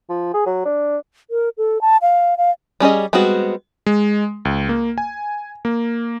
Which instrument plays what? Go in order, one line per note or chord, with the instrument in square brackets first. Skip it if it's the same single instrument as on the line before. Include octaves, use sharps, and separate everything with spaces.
[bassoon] F3
G#4
F#3
D4
[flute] A#4
A4
A5
F5
F5
[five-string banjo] G3 C#4 G#4 D#5
G3 G#3 B3 C4 F#4
[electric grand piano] G#3
C#2
A#3
G#5
A#3